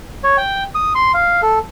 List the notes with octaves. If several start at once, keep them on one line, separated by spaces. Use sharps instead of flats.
C#5
G5
D#6
C6
F5
A4